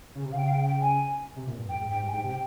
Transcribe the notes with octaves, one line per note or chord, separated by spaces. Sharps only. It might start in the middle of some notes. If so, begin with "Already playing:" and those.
C#3
C3
C#3 F5
G5
F5
G5
G5
G#5
C3
A#2
G2
F2 G5
G#2
G#2 G5
G2
G#5
G#2 G5
C3
G5